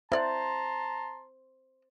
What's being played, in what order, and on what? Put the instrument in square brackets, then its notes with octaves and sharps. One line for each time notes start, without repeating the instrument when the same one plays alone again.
[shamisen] E4 D5 F#5 [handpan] C5 [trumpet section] A5 A#5 C6